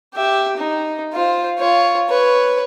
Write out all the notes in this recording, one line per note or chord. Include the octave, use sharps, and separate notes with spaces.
G4 E5
D#4
F4 C5
F4 C#5
B4 C#5